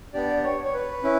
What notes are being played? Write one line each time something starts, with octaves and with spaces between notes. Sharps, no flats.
B3 D4 G4 D5
C#5
C#5
B4
C#4 E4